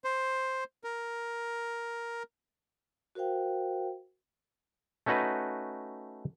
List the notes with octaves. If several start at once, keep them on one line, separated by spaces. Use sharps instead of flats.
C5
A#4
F#4 A#4 C5 F5 G5
A3 C#4 D#4 F#4 B4